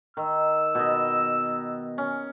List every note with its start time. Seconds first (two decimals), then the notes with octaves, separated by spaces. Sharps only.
0.17 D#3 E6
0.75 B2 D#5
1.98 C#4